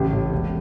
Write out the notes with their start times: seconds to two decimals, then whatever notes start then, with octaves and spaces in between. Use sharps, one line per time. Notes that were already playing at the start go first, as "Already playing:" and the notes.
Already playing: A1 C#3 G4
0.12 A2
0.32 E1